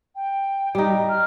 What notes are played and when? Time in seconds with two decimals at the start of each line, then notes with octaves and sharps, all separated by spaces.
0.15 G5
0.75 G3 D#4
1.09 F6